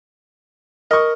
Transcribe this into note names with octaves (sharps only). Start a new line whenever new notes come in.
A#4 D#5 C#6